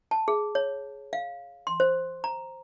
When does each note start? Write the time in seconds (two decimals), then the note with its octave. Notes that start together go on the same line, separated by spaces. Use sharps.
0.11 A5
0.28 G#4
0.55 C#5
1.13 F5
1.67 C6
1.80 C5
2.24 A#5